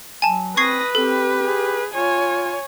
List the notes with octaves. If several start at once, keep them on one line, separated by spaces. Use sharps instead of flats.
F#3 G#5 A5
C4 B4 C#6 D#6 G#6 A#6 C7
C4 G4 A4
G#4
F4 C#5 G#5